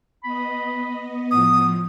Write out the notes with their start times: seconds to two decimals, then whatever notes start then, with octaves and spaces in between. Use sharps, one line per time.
0.23 B3 D#5 B5
1.31 A2 F3 B3 D#6